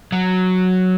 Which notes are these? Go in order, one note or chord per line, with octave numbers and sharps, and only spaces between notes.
F#3